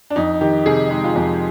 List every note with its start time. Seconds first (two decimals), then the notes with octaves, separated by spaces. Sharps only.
0.10 D4
0.16 F2 D#4
0.41 D#3 G4
0.66 C3 G#4
0.90 G#3 D#4
1.04 F4
1.16 F2 D#4